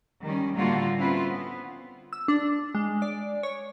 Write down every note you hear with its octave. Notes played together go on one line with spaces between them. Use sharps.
D#3 G3 C#4
A2 D3 G3 A#3 F4 F#4
C4 C#4 E4 F4 B4 C5
B3
E6
D4
G#3
D5
C#5